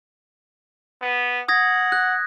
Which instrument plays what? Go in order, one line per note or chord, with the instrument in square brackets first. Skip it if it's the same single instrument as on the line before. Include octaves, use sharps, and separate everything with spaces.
[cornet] B3
[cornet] F#5 [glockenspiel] D#6 G#6 A#6
[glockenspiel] F#6